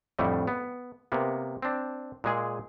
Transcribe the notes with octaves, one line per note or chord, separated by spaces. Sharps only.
F2 A2 D3 G3 A3
B3
C3 A#3 B3
C4 D4
A#2 G#3 G#4